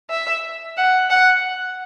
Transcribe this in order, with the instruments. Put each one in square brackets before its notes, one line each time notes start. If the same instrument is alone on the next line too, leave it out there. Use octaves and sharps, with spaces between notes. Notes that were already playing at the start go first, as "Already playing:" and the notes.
[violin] E5
F#5
F#5